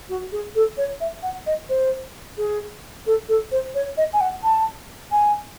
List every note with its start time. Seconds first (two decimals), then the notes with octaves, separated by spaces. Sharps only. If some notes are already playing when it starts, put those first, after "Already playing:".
0.09 F#4
0.32 G#4
0.55 A4
0.77 C#5
1.00 E5
1.23 F#5
1.46 D#5
1.69 C5
2.37 G#4
3.06 A4
3.28 A4
3.51 C5
3.75 C#5
3.97 D#5
4.13 G#5
4.21 F#5
4.43 A5
5.11 G#5